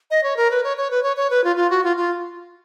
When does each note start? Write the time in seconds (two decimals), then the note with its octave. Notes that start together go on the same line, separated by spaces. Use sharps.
0.11 D#5
0.23 C#5
0.37 A#4
0.51 B4
0.64 C#5
0.77 C#5
0.91 B4
1.03 C#5
1.17 C#5
1.30 B4
1.44 F4
1.56 F4
1.70 F#4
1.84 F4
1.97 F4